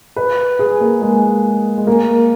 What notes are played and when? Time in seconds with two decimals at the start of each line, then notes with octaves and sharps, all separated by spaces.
0.16 B4
0.59 G#4
0.81 A#3
1.02 G#3
1.78 G#3
1.87 A#3